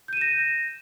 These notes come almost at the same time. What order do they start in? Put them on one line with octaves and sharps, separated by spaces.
G6 D#7 E7 A#6